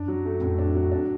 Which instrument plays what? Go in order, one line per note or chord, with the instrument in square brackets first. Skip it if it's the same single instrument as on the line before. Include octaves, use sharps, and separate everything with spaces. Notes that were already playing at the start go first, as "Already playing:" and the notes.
Already playing: [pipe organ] F#2 [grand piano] D4
[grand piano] F#3
A3
[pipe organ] F2 [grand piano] A2
[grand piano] D4
F#3
D4